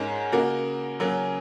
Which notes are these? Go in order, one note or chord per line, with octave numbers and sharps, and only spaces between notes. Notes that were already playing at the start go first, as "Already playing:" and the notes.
Already playing: G#2 G#3 C#4 A#4
C#3 A#3 F#4 A#4
C#3 F#3 A#3 C#4 A#4